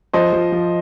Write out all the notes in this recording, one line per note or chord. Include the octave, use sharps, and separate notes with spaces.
F3 C5 D#5
F3
F3